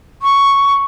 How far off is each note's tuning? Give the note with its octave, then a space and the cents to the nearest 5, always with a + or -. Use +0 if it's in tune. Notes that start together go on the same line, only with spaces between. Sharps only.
C#6 +5